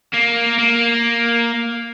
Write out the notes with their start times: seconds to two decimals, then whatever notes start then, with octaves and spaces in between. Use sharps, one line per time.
0.14 A#3
0.59 A#3